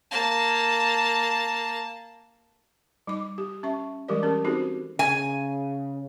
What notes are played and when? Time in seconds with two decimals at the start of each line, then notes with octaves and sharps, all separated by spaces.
0.11 A#3 A5
3.07 G3 D#4 D6
3.38 G4
3.63 C#4 E5 C#6
4.08 E3 G3 G#3 G4 A#4 D5
4.23 C#4 G4 G#4 A#4
4.44 C4 D#4 F#4 G4 A4 C5
4.99 C#3 G#5